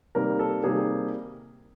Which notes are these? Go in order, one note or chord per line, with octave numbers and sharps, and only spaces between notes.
C3 D#3 G3 A#3 A#4
A4
C3 D#3 G3 A#3 G#4